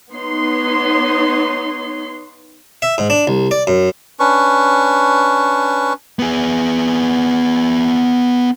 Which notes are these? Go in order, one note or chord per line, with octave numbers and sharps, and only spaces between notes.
B3 D#4 C#5 C6
E5
G#2
D4
C2
D5
F#2
C#4 D4 B4 C#6
B3 G#4